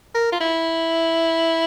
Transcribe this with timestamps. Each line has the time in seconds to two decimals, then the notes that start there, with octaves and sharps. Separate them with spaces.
0.15 A#4
0.32 F4
0.40 E4